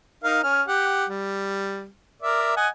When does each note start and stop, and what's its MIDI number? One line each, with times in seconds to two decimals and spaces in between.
0.24 0.40 63
0.24 0.40 70
0.24 0.40 77
0.43 0.62 61
0.43 0.62 89
0.68 1.06 67
0.68 1.06 78
1.08 1.87 55
2.23 2.53 70
2.23 2.53 74
2.23 2.53 76
2.56 2.68 75
2.56 2.68 78
2.56 2.68 80